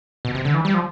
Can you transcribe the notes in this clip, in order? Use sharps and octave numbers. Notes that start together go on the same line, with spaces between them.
B2
C3
D3
E3
G3
F3